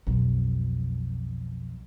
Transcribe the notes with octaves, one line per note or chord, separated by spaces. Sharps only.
B1 F2